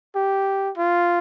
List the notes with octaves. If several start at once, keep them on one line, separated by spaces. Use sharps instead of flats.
G4
F4